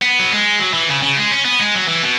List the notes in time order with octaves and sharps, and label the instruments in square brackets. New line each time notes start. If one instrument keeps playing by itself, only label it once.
[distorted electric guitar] B3
F#3
G#3
F#3
E3
C#3
C#3
G#3
C#4
B3
G#3
F#3
E3
B2